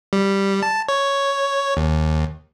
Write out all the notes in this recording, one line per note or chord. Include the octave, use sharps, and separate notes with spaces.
G3
A5
C#5
D#2